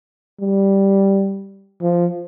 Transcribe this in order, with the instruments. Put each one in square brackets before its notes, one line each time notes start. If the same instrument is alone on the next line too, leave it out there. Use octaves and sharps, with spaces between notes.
[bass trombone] G3
F3